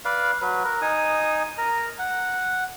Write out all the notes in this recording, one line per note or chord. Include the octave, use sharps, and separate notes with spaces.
B4 D5 F5
F#3 B4
A#4
D#4 G#5 D#6
A#4 A#5
F#5